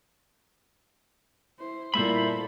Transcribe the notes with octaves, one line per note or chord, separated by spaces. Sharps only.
E4 C5
A#2 G3 E4 A4 A#4 C5 E5 B5